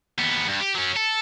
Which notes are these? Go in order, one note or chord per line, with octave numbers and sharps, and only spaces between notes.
D#2 B3
G2
G4
F#3 C#4
A4